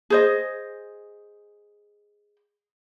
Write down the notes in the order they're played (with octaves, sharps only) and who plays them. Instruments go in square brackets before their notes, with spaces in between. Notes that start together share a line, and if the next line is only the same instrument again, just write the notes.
[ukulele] G#4 C5 D#5